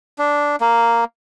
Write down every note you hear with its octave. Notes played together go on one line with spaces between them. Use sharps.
D4
A#3